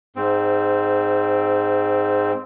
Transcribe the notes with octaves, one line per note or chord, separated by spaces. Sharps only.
G#2 C4